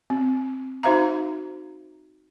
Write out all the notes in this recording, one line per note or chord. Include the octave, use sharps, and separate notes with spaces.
C4
D#4 F#4 C5 E5 F5 A#5